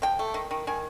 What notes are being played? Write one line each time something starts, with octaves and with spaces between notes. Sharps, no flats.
F3 G5
A3
D#3
D#3
D#3 G#5